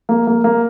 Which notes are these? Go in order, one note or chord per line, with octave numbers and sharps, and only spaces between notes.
A#3
A#3
A#3